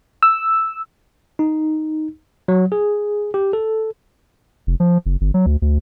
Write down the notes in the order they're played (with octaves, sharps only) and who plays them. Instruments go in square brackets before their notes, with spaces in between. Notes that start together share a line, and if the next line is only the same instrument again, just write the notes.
[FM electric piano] E6
[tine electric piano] D#4
F#3
G#4
G4
A4
[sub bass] F1
F3
F#1
G1
F#3
D2
D2